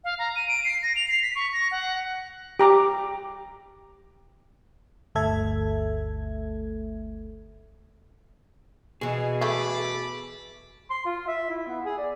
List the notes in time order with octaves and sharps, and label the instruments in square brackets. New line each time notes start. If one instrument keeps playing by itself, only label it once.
[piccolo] F5
A#5
D#7
D7
C7
A#6
F7
C7
B6
C#6
A#6
F#5
[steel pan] G4 A#5 D6
[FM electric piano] G1 D2 A3 A4 E5 G#6
[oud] B2 E3 [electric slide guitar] G#4
[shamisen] A3 E4 [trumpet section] A5 B5 D6
[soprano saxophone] C6
F4
E5
E4
B3
G#4
D5